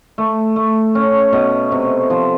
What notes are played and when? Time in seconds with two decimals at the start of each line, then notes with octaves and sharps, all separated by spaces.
0.18 A3
0.56 A3
0.95 C#4
1.33 B2
1.72 C3
2.10 F3